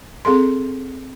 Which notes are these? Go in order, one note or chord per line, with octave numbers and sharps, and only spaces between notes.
C4 G#4 A4 C6